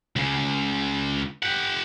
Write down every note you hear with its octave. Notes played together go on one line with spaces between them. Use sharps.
C#2 C#3
G4 F#5